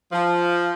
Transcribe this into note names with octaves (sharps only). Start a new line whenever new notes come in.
F3